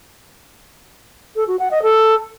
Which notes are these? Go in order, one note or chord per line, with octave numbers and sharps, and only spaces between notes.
A4
F#4
F#5
D#5
A4